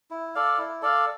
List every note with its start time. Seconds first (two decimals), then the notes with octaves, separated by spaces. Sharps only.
0.11 E4
0.35 A4 D5 F5
0.58 E4
0.82 A4 D5 F5